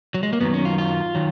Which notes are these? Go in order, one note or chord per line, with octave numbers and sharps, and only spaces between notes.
F#3
G#3
A#3
F#2 D#3 F#3 B3
C#4
F4
F4
D#3 F#3